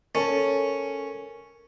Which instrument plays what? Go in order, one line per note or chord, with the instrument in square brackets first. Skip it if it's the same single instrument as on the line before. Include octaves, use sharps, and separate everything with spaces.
[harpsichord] C#4 [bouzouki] A4 A5 [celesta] A#4